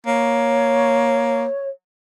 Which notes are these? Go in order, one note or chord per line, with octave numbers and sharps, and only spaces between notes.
A#3 C#5